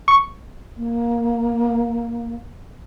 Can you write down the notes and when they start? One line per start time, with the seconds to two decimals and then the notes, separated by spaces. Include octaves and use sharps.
0.08 C#6
0.77 A#3